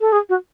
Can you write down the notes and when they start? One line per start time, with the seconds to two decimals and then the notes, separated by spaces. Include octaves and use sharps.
0.01 A4
0.12 G#4
0.29 F#4